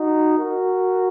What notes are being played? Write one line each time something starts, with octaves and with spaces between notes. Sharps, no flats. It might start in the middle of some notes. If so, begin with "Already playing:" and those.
Already playing: D#4 F#4
F#4 A#4